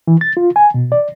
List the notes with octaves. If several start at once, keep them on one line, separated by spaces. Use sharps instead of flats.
E3
A6
F4
G#5
B2
D5